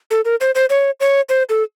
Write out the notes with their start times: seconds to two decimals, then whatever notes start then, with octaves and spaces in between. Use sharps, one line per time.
0.11 A4
0.25 A#4
0.41 C5
0.55 C5
0.70 C#5
1.00 C#5
1.29 C5
1.49 A4